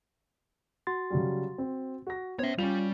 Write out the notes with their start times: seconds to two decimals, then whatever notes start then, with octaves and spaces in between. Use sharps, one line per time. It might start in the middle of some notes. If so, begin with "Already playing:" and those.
0.87 F#4 C6 A6
1.10 C#3 F#3 G3
1.58 C4
2.07 F#4 A#6
2.39 B3 C#4 C5 C#5 E5
2.59 G3 C#4 F4 F7